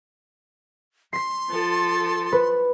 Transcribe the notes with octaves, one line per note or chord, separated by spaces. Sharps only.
C6 B6 C7
F3 A4
B4